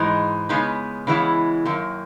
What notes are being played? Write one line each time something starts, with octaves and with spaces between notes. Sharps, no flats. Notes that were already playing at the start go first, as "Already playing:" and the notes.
Already playing: G#2 E3 G#3 D#4
C#3 G#3 B3 D#4
C#3 E3 G#3 B3 E4
F#2 D#3 A#3